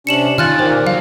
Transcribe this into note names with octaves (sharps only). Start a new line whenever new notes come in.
C3 C#4 D4 C#7 E7 F#7
D#3 F4 G#5 F6 F#6 A6
A#2 A#3 G4 C5
F#3 F5